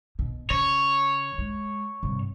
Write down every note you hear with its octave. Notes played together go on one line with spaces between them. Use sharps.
B2
C#3 C#5
G#3
G2 C3